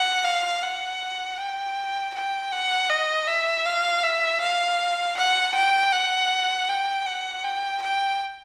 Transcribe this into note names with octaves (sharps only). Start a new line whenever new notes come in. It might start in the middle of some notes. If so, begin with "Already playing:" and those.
Already playing: F#5
F5
F#5
G5
G5
F#5
D#5
E5
F5
E5
F5
F#5
G5
F#5
G5
F#5
G5
G5